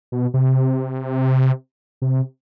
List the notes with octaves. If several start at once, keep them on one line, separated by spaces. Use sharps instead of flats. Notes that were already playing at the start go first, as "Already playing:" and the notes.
B2
C3
C3